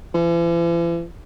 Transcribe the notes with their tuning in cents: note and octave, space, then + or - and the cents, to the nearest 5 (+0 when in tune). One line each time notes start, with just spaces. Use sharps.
E3 +45